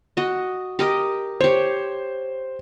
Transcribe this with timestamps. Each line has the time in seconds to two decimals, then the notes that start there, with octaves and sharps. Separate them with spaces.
0.17 F#4 D#5
0.79 G4 A#4 D#5
1.41 G4 C5 C#5